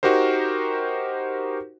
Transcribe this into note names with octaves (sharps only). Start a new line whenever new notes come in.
D#4 F#4 G4 A#4 C5